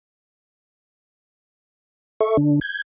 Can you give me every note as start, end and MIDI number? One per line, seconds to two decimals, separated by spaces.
2.21 2.37 69
2.21 2.37 76
2.21 2.37 85
2.37 2.60 50
2.37 2.60 62
2.61 2.82 91
2.61 2.82 92